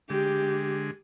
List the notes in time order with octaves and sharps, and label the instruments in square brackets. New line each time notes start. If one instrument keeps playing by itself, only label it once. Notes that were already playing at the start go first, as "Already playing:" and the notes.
[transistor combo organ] D3 G#3 [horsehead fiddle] G4